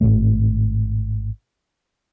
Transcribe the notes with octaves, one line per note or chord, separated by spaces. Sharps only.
G#1 E2 A2 A3